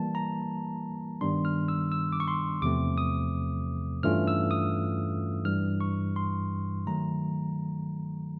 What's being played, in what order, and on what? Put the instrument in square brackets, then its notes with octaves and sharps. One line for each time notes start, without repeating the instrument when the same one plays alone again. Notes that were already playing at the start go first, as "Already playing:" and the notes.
Already playing: [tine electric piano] E3 G3 A#3 A5
A#5
G2 D#3 G3 B3 D4 C6
F6
E6
E6
D6
C#6
C6
E2 C3 F3 A3 C4 D6
D#6
G2 E3 A3 C#4 F4 F6
E6
D#6
G2 E3 G3 F6
C#6
C6
D#3 F#3 A3 A#5